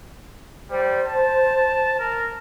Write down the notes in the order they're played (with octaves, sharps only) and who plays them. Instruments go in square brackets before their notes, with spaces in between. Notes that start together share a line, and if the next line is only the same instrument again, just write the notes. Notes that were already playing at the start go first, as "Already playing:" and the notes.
[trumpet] G3 [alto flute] C5
[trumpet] A5
A#4